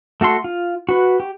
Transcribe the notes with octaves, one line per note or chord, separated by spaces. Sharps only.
A3 F#4 A4 C6
F4
F#4 B4
G4